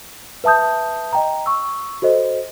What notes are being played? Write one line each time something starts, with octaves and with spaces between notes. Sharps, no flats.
B4 E5 A5 D#6 G6
D#5 G5 A#5
C#6 E6
F#4 A4 C5 D#5